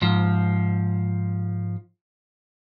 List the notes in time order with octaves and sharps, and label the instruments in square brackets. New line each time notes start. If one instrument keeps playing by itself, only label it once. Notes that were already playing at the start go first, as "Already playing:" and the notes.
[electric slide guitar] G#2 F3